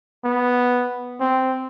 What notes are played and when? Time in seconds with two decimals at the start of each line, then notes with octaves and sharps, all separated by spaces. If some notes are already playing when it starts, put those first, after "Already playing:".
0.25 B3
1.20 C4